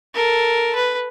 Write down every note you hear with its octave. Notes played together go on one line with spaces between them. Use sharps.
A4 A#4
B4